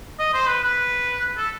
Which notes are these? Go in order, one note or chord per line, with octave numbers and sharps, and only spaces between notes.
D#5
C5
B4
B4
A4